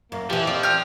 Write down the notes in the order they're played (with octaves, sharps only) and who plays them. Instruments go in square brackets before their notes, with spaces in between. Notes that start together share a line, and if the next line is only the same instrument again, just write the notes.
[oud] F#2 [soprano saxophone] A#3
[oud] E2 E3 [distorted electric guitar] F3 [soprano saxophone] G4
[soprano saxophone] C4 [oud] D5
[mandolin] G4 F6